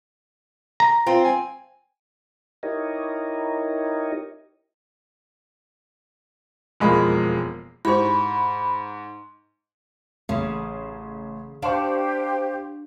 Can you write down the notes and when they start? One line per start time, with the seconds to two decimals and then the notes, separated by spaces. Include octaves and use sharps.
0.80 A#5
1.07 C4 F4
1.25 G#5
2.63 D#4 E4 G4 A#4 C#5 D#5
6.80 E1 F2 G#3 A#3 B5
7.85 G#2 E4 G4 C5 B5 C#6
10.29 A1 C#3
11.62 D4 G4 C5 F5 C6 C#6